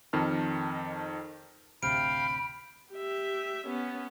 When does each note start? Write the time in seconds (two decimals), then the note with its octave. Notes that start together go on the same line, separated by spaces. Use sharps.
0.13 F2 D#3 A5 F6
1.83 A1 D2 C3 F5 G5 B5 F6 D7
2.93 G4 E5
3.67 B3 C#4